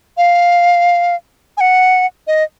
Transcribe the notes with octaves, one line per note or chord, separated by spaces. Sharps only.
F5
G#5
F#5
D#5